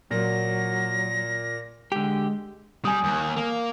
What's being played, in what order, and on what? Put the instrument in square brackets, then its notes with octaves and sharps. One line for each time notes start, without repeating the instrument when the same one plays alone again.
[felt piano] A#2 [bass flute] F#3 [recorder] A#6
[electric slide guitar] D3 G4 [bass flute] G#3
[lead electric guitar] G3 [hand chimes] G#5 D#6
[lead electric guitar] D#2
A#3